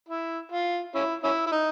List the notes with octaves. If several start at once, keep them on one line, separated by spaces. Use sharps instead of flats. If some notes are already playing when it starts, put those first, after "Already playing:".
E4
F4
C#4 E4
C#4 E4
E4
D#4